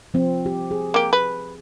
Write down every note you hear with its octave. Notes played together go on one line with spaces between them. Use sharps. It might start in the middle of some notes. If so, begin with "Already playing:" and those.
F3 C4
G4
G#4
A#3 G4
B4